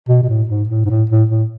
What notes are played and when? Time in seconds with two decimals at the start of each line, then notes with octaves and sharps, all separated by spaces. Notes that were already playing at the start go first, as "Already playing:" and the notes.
0.08 B2
0.23 B2
0.29 A2
0.49 G#2
0.69 A2
0.85 G#2
0.89 A2
1.10 A2
1.29 A2